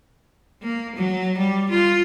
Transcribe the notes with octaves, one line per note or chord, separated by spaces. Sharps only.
A#3
F#3
G3
F4